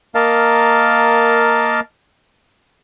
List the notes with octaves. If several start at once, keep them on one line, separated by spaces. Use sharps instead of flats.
A#3 A#4 D#5 F5 A5